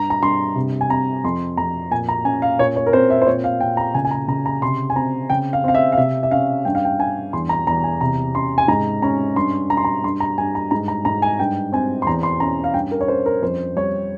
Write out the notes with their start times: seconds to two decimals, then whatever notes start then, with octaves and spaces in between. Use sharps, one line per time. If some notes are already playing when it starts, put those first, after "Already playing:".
Already playing: G2 A#5
0.10 A#5
0.22 G2 C6
0.56 C3
0.81 G#5
0.90 C4 A#5
1.24 F2 C6
1.57 F2 A#5
1.91 A#2 G#5
2.09 A#5
2.25 C#4 G#5
2.42 F5
2.59 A#2 C#5
2.76 C#5
2.86 A#4
2.93 C4 C5
3.10 E5
3.22 C5
3.27 A#2 C#5
3.44 F5
3.61 A#2 G5
3.77 A#5
3.94 C#3 G#5
4.05 G#5
4.11 A#5
4.28 C#3 A#5
4.46 A#5
4.62 C3 C6
4.90 G#5
4.96 C4 A#5
5.30 C#3 G5
5.53 F5
5.64 C4 F5
5.75 E5
5.92 F5
5.98 C3 E5
6.23 E5
6.31 C#4 F5
6.65 G2 G5
6.75 F5
6.85 G5
6.99 G2 G#5
7.33 E2 C6
7.49 A#5
7.66 E2 A#5
7.84 G#5
8.01 C3 A#5
8.34 C#4 C6
8.58 G#5
8.68 G#2 A#5
9.02 C#4 A#5
9.36 G2 C6
9.70 G2 A#5
9.77 C6
9.84 A#5
10.04 G2 C6
10.20 A#5
10.38 G2 G#5
10.55 A#5
10.71 G#2 A#5
10.88 A#5
11.05 G#2 A#5
11.22 G#5
11.39 G2 G5
11.72 C4 G#5
12.02 C6
12.06 E2 A#5
12.23 C6
12.40 C#4 A#5
12.64 F5
12.74 G2 G5
12.91 A#4
13.01 C#5
13.08 C#4 C5
13.26 A#4
13.42 F2 C5
13.76 G3 C#5